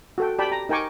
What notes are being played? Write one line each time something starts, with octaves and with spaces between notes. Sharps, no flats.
F#4 A4 G5
G4 D5 G5 A5 B5
A#5
D#4 A#4 G5 G#5 C#6 D6